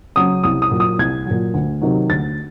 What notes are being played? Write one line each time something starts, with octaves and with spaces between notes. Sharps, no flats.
C#3 F#3 D#6
C2 D#6
D#6
A#2 F#3
D#6
C2 G#6
A#2 F#3
D2
C3 D#3 F#3
D2 A6